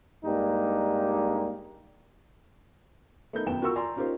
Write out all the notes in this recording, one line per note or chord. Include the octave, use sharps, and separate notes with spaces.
G2 G#3 A#3 D4 D#4 G4
A3 B3 D#4 A#4 G6
D#1 F#2 B3 G5 E7
F4 F#4 A#4 A#5 C#6 E6
D5 G#5 A#5 C6
C#4 D#4 F4 G4 A#4 C5